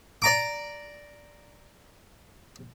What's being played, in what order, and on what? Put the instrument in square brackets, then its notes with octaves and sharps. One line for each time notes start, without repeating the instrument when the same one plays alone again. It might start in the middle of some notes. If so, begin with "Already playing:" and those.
[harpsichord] D5 A#5 D6